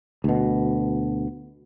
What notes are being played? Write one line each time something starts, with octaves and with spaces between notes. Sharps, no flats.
D2 B2